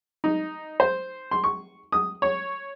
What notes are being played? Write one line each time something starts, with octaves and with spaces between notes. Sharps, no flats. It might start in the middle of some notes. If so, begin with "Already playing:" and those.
D#4
C5
C6
C#6
D#6
C#5